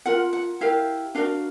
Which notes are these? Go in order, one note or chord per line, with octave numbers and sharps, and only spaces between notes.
F4 A#4 F#5
F#5
E4 G4 A#4 F5
D4 F#4 A#4 F5